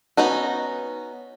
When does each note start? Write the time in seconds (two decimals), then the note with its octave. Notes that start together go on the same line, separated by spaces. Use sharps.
0.17 B3 C#4 D#4 F#4